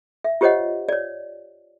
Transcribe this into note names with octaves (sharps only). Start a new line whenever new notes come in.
E5
F4 G4 C5 C#5 D#5 F#5
C#5 D5